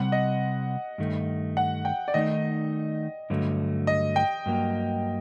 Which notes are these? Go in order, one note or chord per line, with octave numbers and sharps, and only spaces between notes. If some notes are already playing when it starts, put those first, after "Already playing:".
Already playing: C3 G3 C4 F#5
D#5
G2 D#3 A3
F#5
G5
D5
D#3 A3 D#4 D#5
G2 D3 F#3 A3
D#5
G5
G2 F#3 A#3